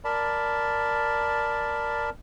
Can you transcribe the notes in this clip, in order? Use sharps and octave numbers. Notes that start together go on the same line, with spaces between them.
A#4 D5 A5 B5